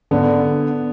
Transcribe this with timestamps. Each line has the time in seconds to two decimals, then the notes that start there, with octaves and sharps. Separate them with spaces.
0.11 D3 B3